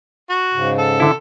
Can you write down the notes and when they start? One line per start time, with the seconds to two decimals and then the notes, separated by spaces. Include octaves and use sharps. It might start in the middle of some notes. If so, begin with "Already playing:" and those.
0.30 F#4
0.53 G#2 C#3
0.78 A4
1.00 D3 E4